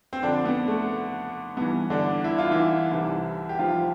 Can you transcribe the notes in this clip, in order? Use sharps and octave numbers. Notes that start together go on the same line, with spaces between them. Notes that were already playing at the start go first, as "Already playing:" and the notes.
C4
F2 D3 D4
B3
A3
G2 E3 B3
D3 D4
E4
F4
E3 E4
C2 C3 E3
G4
F3 F4